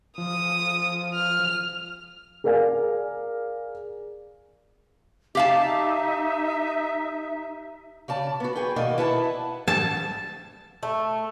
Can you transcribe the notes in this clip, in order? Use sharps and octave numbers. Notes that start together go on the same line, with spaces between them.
F3 D#6
F6
G#4 A#4 D5 F5 G#5
D#4 G4 E5 F5 A5
C#3 D5 A5
B3 F#4
G#4 B4 G5
B2 D#3 A#3 D5 D#5
E4 B4 E5 F#5 A5
A5
A3